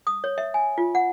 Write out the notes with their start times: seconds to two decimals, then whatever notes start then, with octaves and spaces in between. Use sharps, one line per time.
0.07 D#6
0.24 C#5
0.38 E5
0.54 G#5
0.78 F4
0.95 F#5